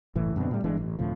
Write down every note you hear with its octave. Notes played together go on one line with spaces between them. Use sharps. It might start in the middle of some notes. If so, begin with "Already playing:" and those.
F#1 A2 E3
F#2 B2 D3 C4
A2 G3
G1 E3 G#3 D4
A1
D2 A2 C3 F3